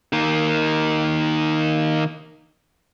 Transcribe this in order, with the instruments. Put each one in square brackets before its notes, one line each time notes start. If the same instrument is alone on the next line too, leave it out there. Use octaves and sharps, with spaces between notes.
[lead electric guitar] D#3 A#3